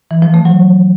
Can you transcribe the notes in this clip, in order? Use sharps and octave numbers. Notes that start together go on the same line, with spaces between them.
E3
F3
A3
F#3